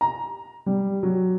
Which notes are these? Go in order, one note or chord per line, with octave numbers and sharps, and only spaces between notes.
A#5
G3
F#3